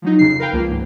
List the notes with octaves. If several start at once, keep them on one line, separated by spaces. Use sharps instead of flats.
F3 F#3 D#4
F2 C#3 C7
A#4 B4 F5 G5
C#2 F3 A#3
G#2